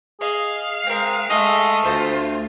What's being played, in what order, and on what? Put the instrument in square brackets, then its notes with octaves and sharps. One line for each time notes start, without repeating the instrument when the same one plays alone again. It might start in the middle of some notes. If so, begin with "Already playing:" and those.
[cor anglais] G#4 [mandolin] D#5 [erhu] F5
[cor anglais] G#3 [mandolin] C4 A#4
[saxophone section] G#3 D#5 [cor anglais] A3 [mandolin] G#4
[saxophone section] D2 [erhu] F4 [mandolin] A4 C5 E5